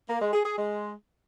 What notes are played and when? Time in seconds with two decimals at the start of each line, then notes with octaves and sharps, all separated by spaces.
0.09 A#3
0.21 G#3
0.33 G#4
0.45 G#4
0.57 G#3